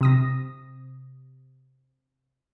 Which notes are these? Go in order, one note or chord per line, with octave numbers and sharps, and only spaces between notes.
C3 D#6 A#6